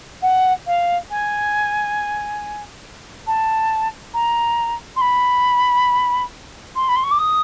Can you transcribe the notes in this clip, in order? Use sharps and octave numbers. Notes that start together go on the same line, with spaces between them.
F#5
F5
G#5
A5
A#5
C6
B5
C6
B5
C6
C#6
D6
D#6